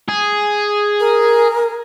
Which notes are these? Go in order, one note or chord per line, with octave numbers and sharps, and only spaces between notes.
G#4
A#4